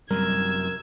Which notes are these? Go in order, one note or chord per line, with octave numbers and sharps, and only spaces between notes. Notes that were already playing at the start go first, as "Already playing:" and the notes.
F#2 C3 G3 A#4 E6 G#6